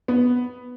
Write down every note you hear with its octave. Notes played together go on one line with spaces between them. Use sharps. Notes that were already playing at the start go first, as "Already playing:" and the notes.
B3